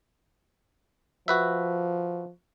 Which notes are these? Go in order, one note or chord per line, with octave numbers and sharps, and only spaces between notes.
F3 F#4 B4 E5